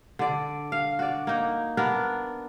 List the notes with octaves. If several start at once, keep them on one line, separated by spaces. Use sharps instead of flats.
D3 D5
F5
F#4 D5
A#3 D#4
B3 D4 A#4